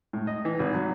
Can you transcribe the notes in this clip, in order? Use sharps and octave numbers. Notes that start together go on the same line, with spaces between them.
A2
D#5
E3
G#1
F#3